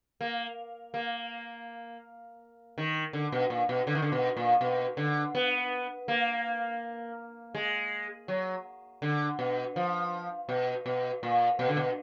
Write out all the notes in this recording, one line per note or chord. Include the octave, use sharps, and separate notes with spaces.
A#3
A#3
D#3
D3
B2
A#2
B2
D3
D#3
D3
B2
A#2
B2
D3
B3
A#3
G#3
F#3
D3
B2
F3
B2
B2
A#2
B2
D3
B2